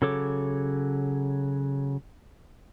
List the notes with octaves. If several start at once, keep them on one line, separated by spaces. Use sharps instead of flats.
C#3 F#3 A4 C#5 D6